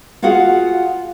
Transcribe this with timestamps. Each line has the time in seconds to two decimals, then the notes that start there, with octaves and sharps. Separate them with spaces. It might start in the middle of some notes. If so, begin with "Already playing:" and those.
0.22 F4 F#4 G#4 F5 F#5